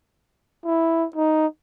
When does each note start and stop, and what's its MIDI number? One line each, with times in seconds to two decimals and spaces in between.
0.65 1.06 64
1.16 1.46 63